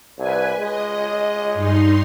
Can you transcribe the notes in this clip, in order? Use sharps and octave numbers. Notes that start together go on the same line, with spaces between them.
C2 B4 G#5
G#3 D#5
G2 D#4 C6